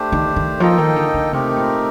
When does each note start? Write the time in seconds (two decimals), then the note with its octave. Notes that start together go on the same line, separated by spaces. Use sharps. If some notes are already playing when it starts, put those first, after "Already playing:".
Already playing: A3 D4 G4 C5
0.12 D#3
0.36 D#3
0.60 F3 A#3 D#4 A4 D#5 G5
0.78 D#3
0.96 D3
1.14 D3
1.32 C3 A3 C4 D#4 G4 A#4
1.56 A#2